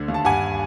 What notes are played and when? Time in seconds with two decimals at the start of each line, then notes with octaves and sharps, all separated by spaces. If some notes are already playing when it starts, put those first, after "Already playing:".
Already playing: D2 D3
0.08 D#2
0.14 A5
0.25 G2 F#5 G#5